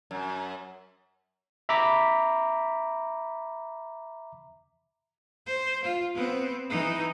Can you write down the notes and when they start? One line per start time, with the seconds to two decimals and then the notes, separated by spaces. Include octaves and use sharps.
0.11 F#2
1.69 E5 A#5 B5 D6 B6
5.47 C5
5.84 F4
6.15 B3 C4
6.69 E3 D#4